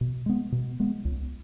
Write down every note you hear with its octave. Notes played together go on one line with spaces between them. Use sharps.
B2
G#3 B3
B2
G#3 B3
C#2